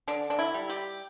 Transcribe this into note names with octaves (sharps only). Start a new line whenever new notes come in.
D3 D4
D4
E4
G3
G4